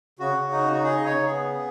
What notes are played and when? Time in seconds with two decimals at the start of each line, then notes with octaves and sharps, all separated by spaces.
0.19 C#3 F#4
0.35 C#3
0.52 D#4
0.67 C#3
0.73 F#4
0.83 D#4 G#4
0.97 C#3 D#5
1.05 C#5
1.15 C#3
1.26 G#4
1.31 B3